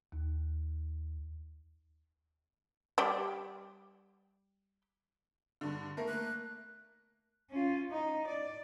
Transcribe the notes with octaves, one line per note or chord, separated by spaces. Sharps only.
D#2
G3 D5 G5
G2 D3
A3 A#3 A#4
F#6
C#4 F4
D#4
D5